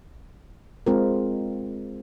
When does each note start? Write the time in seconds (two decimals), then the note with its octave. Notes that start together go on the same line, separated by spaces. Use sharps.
0.86 G#3 C4 F4 A#4